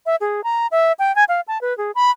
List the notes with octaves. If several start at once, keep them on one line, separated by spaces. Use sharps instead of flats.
E5
G#4
A#5
E5
G5
G#5
F5
A5
B4
G#4
B5